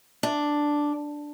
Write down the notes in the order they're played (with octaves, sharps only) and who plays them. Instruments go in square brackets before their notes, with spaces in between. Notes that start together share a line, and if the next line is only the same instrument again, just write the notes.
[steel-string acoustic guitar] D4